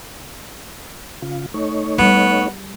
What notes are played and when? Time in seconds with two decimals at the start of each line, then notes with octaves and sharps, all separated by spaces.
1.22 C#3 F4
1.54 A3 D#4 C#5
1.98 G3 B3